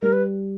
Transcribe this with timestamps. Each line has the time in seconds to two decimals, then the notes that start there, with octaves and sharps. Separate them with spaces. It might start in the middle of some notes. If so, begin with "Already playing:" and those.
0.02 G3 A#4
0.13 B4